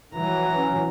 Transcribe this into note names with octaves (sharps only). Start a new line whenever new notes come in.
E3 F#3 A#5
C#4